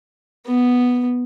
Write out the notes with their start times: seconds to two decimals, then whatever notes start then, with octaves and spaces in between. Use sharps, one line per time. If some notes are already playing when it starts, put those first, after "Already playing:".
0.47 B3